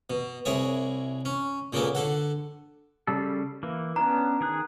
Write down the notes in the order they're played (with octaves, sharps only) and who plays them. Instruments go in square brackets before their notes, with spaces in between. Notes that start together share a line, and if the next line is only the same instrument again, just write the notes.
[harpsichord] B2
C2 E4 G#4 C#5
C#4
A#2 C#3 A#3 B3 A4
D3 A4 F#5
[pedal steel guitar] C#3 G3 A4
E3 A#3
[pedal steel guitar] B3 C#4 D4 [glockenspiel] A#5
[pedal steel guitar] D#3 G#4 F#6